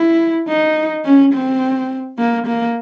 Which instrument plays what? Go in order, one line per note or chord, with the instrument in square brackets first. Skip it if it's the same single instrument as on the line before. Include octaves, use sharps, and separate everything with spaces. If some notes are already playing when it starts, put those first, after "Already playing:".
Already playing: [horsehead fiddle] E4
D#4
C#4
C4
A#3
A#3